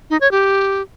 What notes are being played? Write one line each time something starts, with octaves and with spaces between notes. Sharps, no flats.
D#4
C#5
G4